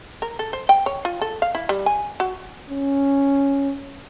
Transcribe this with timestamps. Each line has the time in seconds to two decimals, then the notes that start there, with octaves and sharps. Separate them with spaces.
0.22 A#4
0.39 A4
0.53 C5
0.69 G5
0.86 C#5
1.05 F4
1.21 A4
1.42 F5
1.55 E4
1.69 G3
1.86 G#5
2.20 F#4
2.70 C#4